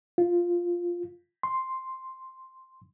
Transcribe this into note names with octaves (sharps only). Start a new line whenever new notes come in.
F4
C6